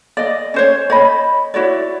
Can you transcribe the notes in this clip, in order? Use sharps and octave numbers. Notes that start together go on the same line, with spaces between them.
D5 D#5
C#4 C5 C#5
C#5 D#5 B5
E4 F#4 C#5 D5